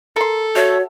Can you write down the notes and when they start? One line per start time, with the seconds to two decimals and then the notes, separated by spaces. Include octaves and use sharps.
0.16 A4 A#4 C6
0.56 A3 F#4 C#5